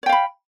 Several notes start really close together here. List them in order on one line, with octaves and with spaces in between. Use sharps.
C#5 G5 F5 B5